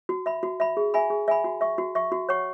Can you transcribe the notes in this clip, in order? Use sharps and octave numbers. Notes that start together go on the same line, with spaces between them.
F#4
E5 B5
F#4
E5 B5
G#4
E5 G#5 B5
G#4
E5 G#5 B5
F#4
E5 C#6
F#4
E5 C#6
F#4
C#5 F#5 C#6